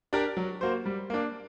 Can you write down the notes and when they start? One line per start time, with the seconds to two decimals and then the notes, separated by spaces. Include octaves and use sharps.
0.13 D4 G4 A#4 D5
0.37 F#3
0.61 A#3 F#4 C5
0.86 G3
1.10 A#3 D4